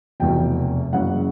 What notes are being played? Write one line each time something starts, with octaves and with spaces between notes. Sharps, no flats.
F1 E2 B2 G5
F#1 F#2 C#3 E3 F#5